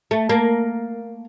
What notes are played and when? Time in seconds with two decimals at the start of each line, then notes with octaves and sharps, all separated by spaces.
0.11 A3
0.29 A#3